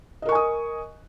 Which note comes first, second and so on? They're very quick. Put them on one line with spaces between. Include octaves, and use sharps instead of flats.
D#5 A#4 C#6 G#5 D#6